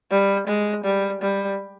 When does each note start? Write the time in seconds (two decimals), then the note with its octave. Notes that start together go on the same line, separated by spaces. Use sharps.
0.10 G3
0.47 G#3
0.84 G3
1.21 G3